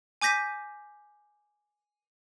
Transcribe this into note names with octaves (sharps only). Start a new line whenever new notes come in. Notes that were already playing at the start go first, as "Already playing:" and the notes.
G#5 D6 G6 A#6 B6 D#7